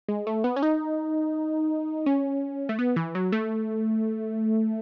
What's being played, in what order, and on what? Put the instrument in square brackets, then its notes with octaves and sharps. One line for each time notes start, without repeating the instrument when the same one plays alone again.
[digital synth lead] G#3
A3
B3
C#4
D#4
C#4
A3
B3
E3
F#3
A3